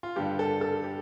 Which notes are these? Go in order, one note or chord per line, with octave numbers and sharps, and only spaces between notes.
F4
G2 D3 G3 G4
A4
A4
G4